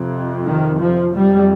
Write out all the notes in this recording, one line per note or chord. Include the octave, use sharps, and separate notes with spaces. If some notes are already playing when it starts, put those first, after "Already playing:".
Already playing: F2 C3
D#3
F3
F2 C3 G3